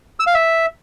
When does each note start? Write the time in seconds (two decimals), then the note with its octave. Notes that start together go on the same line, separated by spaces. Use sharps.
0.20 E6
0.27 F5
0.34 E5